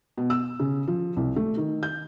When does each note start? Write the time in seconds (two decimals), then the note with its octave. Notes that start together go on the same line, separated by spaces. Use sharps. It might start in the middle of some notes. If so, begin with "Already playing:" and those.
0.18 B2
0.30 E6
0.60 C#3
0.87 F3
1.17 C2
1.36 A3
1.57 D#3
1.83 G6